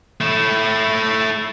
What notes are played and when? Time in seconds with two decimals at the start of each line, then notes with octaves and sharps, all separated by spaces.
0.21 A3 E4